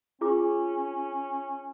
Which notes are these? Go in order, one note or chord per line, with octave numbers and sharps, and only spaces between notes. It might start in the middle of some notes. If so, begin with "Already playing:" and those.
C#4 F4 G#4 D6